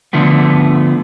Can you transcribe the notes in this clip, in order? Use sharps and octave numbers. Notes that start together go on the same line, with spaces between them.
D3 F3 A3 B3